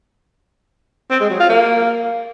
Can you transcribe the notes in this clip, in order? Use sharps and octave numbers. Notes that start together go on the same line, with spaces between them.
C4
G#3
F#3
F4
A#3